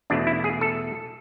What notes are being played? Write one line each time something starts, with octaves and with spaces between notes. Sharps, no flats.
E2 B2 A3 D4
E4
G#4
A4